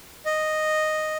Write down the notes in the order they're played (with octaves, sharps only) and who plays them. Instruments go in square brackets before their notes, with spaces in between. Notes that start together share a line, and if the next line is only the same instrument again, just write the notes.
[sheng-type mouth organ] D#5